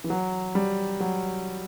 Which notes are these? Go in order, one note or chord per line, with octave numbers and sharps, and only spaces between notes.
E3
F#3
G3
F#3